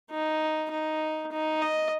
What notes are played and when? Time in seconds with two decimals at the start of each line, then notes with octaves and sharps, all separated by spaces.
0.10 D#4
0.71 D#4
1.32 D#4
1.62 D#5